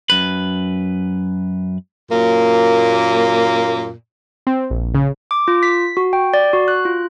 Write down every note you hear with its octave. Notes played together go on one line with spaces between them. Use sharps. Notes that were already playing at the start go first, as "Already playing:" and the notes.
F#2 B4
F#2 A#2 A#3
C4
A#1
C#3
D6
F4
B6
F#4
G5
D5
F#4
F#6
F4